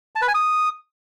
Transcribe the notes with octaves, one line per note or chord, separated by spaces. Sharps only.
A5
B4
G#5
D#6